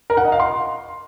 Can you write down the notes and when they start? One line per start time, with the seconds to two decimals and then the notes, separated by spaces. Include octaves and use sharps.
0.10 A#4
0.17 F#5
0.25 D#5
0.32 F5
0.40 C6